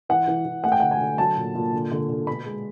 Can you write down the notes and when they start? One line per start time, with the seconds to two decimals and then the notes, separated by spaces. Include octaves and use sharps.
0.09 E3 F#5
0.28 E3
0.45 E3
0.64 A3 F#5
0.72 G5
0.80 D3 F#5
0.91 G#5
1.00 D3
1.18 F#3 A5
1.37 A#2
1.55 A#2
1.73 D3
1.91 D3
2.09 D3
2.27 B2 B5
2.46 G#3